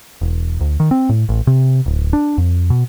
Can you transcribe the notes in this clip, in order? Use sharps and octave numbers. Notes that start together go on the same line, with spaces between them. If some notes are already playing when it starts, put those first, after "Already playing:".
E1
D2
D#3
C4
A2
A1
C3
D1
D4
F2
B2